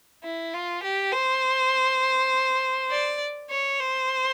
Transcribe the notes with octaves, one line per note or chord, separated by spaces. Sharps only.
E4
F4
G4
C5
D5
C#5
C5